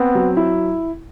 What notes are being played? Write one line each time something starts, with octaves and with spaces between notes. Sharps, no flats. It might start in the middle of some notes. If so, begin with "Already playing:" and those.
Already playing: B3 C4
F#3
E4